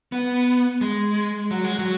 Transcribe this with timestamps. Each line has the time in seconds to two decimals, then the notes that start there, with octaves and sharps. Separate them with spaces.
0.12 B3
0.81 G#3
1.51 F#3
1.65 G#3
1.79 F#3